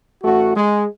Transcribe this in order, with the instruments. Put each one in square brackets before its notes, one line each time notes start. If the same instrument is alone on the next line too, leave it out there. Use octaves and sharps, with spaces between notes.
[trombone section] A1 A3 F#4
G#3